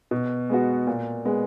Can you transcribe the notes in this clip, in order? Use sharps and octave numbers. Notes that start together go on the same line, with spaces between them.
B2
G#3 B3 F#4
A#2
G#3 B3